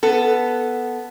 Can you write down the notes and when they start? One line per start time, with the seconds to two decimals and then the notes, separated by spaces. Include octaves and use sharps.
0.03 B3 A4